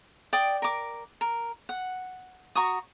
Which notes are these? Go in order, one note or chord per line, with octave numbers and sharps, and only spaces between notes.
D5 G5 D#6
A#4 D6
A#4
F#5
F#4 A#5 C#6 D#6